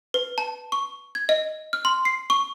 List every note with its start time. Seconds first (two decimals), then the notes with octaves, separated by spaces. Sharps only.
0.14 B4
0.38 A5
0.72 C#6
1.15 G#6
1.29 D#5
1.73 F6
1.85 C6
2.05 C7
2.30 C#6